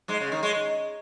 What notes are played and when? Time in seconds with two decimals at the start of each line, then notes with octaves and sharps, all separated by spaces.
0.08 G#2 G#3
0.20 C#3
0.32 D#3
0.43 G#3